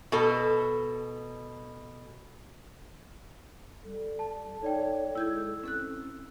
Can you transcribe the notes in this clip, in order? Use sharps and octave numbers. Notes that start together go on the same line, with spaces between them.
B2 A4
G3 A4
A5
D#4 C#5 D5 G5
G#3 E4 E6 G6 G#6
C4 C#4 A4 F#6